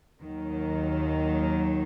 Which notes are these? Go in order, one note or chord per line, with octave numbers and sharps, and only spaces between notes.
D#2 D#3 F#3